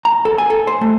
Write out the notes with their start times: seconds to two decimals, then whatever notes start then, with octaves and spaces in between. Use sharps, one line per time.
0.05 A#5
0.25 A4
0.38 G#5
0.50 A4
0.67 C5
0.81 A3